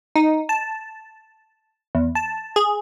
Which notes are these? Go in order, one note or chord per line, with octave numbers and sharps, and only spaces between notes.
D#4
A5
E2
A5
G#4